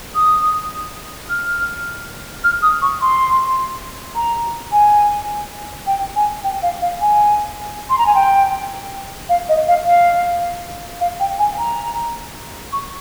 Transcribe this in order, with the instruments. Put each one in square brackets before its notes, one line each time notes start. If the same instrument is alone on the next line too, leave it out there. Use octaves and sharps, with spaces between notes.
[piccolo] D#6
F6
F6
D#6
C#6
C6
A#5
G#5
G5
G#5
G5
F5
F5
G#5
C6
A#5
G#5
G5
F5
D#5
F5
F5
F5
G5
G#5
A#5
C#6